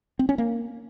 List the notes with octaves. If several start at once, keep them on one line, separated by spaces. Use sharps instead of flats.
C4
C#4
A#3